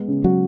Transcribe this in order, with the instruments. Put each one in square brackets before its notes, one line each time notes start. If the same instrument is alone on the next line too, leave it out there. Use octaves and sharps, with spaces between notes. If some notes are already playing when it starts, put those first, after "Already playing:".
Already playing: [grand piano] G#3 B3
C#3
[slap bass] F#3 [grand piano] F#4